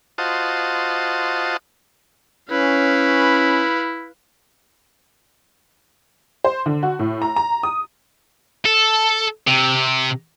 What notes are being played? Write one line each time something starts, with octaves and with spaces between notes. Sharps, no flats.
F4 F#4 C5 D#5 A5
C#4 E4 B4 F5
C5
D3
F#4
A2
A#5
A#5
D#6
A4
C3